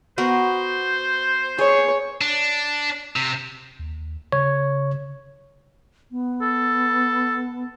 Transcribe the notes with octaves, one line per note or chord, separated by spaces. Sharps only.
B3 F#4 A#4 C5
G#4 C#5
D4
C3
D#2
C#3 C#5
B3
A4